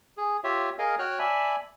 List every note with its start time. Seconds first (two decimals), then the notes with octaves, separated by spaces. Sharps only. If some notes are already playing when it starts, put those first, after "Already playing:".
0.17 G#4
0.44 F4 G4 C#5 E5
0.79 G#4 A#4 D#5 F5 G#5
0.99 F#4 C#5 G5 F6 F#6
1.19 D5 E5 G#5 A5 B5